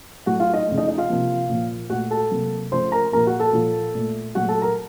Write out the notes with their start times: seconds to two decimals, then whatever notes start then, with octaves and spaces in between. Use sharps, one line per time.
0.26 A2 F#3 A3 F#4 F#5
0.40 F4 F5
0.54 D#4 D#5
0.67 C#3 F3 A3
0.78 D#4 D#5
0.88 D#4 D#5
0.98 F4 F5
1.09 C3 F3 A#3
1.49 A#2 F3 A#3
1.90 A#2 A3 F#4 F#5
2.11 A4 A5
2.31 C3 F#3 A#3
2.71 C#3 F3 A3 C5 C6
2.92 A#4 A#5
3.12 A#2 F3 A#3 A#4 A#5
3.27 F#4 F#5
3.39 A4 A5
3.53 A#2 F3 A#3
3.95 A#2 A3
4.35 A#2 F#3 A3 F#4 F#5
4.49 A4 A5
4.62 A#4 A#5